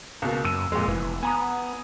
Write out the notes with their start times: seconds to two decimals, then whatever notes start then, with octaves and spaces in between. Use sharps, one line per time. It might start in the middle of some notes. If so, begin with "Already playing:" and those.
0.22 C#2 B2 A#3
0.45 F#2 E6 D#7
0.72 F2 A#2 G#3
0.88 F1 E3
1.23 B3 G#5 A#5 D#6